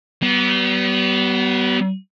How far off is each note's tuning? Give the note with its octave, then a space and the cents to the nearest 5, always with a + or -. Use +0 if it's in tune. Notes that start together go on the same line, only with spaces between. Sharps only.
G3 -45 B3 +0